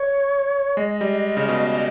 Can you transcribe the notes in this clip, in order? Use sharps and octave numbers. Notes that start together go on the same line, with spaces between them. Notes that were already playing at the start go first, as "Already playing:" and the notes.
Already playing: C#5
G#3 D#5
G3
C#3
B2